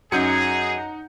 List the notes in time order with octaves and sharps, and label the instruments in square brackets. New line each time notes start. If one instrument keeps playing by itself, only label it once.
[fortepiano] F#2 [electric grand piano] D#4 G6 C#7 [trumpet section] G#4 [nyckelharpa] F#5 A#5